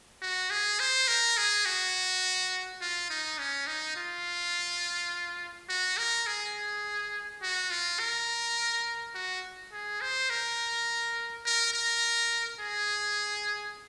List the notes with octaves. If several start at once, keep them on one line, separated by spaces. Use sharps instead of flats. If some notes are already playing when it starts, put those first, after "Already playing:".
F#4
G#4
C5
A#4
G#4
F#4
F4
D#4
C#4
D#4
F4
F#4
A#4
G#4
F#4
F4
A#4
F#4
G#4
C5
A#4
A#4
A#4
G#4